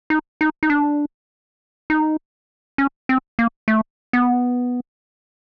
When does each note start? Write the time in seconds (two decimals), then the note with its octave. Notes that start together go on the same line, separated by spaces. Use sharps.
0.10 D#4
0.41 D#4
0.63 D#4
0.70 D4
1.90 D#4
2.78 C#4
3.09 C4
3.39 A#3
3.68 A3
4.13 B3